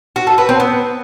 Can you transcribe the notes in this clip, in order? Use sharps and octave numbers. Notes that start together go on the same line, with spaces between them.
F#4
A4
B4
C4
B3